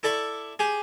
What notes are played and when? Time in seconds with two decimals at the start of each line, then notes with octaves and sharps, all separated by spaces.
0.03 E4 A4 D5 E5 C#6
0.59 G4 G#4